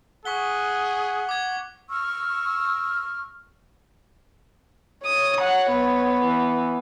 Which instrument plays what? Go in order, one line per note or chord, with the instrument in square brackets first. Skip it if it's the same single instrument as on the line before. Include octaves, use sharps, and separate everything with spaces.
[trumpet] G#4 [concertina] F#5 [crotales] C#6 B6 G7
[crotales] D6 G#6
[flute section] C#6 E6 F6
[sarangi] C#5 [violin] D#6
[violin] F#5
B3
[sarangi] E3